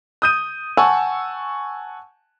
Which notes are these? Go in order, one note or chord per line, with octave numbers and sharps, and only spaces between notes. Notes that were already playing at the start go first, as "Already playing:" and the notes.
D#6 G6 D#7
F#5 G#5 A5 C#6 E6